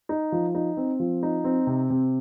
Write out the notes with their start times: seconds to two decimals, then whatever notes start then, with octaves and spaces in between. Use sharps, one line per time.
0.09 D#4
0.32 F3
0.55 D#4
0.77 C4
1.00 F3
1.23 D#4
1.44 C4
1.67 C3
1.90 C3